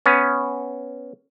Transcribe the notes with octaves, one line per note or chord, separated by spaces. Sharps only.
B3 C#4